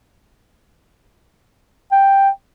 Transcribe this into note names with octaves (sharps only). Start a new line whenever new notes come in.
G5